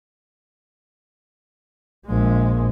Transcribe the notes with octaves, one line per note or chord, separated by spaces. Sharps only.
A#1 G#3